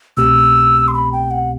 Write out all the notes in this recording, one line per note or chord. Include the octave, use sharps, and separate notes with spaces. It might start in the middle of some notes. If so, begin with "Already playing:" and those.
C2 B2 A3 C4 G4 E6
C6
B5
G5
F#5